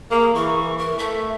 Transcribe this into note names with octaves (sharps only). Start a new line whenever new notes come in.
A#3 G#4
E3 C#6
A#4
A3 E5